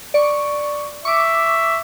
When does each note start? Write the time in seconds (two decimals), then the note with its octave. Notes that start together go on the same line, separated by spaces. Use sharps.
0.14 D5 C#6
1.05 E5 C#6 D6